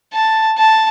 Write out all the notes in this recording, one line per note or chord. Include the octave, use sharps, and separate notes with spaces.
A5
A5